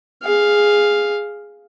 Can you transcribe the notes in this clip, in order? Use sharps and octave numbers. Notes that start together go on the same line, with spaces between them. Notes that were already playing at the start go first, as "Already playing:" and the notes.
G#4 F5